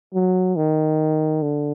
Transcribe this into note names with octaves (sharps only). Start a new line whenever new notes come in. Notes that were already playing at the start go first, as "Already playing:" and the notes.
F#3
D#3
D3